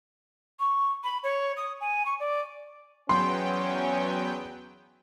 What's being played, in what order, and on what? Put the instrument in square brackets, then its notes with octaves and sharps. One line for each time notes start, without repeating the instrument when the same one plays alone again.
[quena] C#6
B5
C#5
D#6
G#5
C#6
D5
[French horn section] E2 C#4 [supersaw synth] F#3 B3 G5 [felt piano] C6